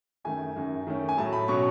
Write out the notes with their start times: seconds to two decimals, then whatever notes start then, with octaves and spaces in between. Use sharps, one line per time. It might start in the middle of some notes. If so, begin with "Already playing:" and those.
0.24 F#2 D#3 A3 D#4 G#5
0.56 F#2 D#3 A3
0.87 D#3 A3 C#4
1.09 G#5
1.17 A2 F#3 A3 A5
1.33 B5
1.48 B2 F#3 C#4 C#6